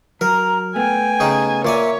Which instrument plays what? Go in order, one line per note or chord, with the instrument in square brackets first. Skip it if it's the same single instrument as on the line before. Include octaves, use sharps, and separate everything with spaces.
[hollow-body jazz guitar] F#3 [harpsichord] A#4 [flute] A#5
[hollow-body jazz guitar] A3 B3 [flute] G5 [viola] G#5
[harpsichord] C#3 D#4 G#4
[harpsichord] A#2 D5 G#5 [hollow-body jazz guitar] A#3 [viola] C#5 [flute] E5